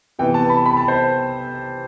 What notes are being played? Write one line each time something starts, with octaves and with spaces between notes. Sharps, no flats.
C3 E3 B3 G5
A5
B5
B5
A5
C5